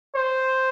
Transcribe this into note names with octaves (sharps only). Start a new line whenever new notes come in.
C5